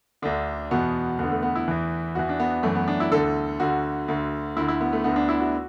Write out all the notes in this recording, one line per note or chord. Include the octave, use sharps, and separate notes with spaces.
D2 D3 D4
E2 B2 B3
E2 D3 B3
A3
B3
E4
E2 E3
E2 E3 F#4
D4
B3
F#2 E3 A3
B3
D4
E4
D2 D3 A4
D2 D3 F#4
D2 D3
D2 D3 E4
E4
B3
A3
D2 D3 B3
D4
E4
F#4